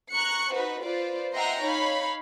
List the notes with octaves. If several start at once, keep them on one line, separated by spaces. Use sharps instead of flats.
A#5 C#6 F#6 C#7
D#4 F#4 B4 C5
F4 B4 C5 D5
D#5 E5 F#5 G5 A#5 C6
D#4 C#5 F5 B5